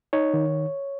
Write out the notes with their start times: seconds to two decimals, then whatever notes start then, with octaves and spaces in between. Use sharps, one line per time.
0.13 D#4 C#5
0.34 D#3